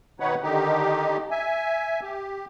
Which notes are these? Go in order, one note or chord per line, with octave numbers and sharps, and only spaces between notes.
B2 D#3 D#4 B4 C#5 F#5
D3 D#3 D#4 G4
E5 G#5
G4